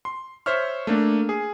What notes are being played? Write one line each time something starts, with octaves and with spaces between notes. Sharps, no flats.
C6
C5 C#5 E5 C#6 F6
A3 A#3 D4
G#4